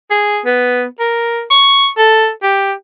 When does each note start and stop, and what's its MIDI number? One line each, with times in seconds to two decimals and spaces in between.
0.11 0.41 68
0.46 0.84 59
1.00 1.42 70
1.50 1.88 85
1.97 2.30 69
2.43 2.73 67